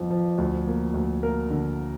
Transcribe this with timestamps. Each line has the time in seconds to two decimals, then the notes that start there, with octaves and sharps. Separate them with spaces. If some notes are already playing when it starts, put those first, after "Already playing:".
Already playing: G1 F2 F3
0.10 F3
0.38 D2
0.67 A#3
0.94 D2
1.23 A#3 A#4
1.50 D3